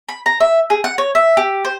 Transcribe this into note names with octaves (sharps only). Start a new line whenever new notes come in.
B5
A#5
E5
G#4
F#5
C#5
E5
G4
C5